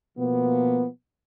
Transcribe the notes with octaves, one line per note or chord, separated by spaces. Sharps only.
B2 F3 A#3 B3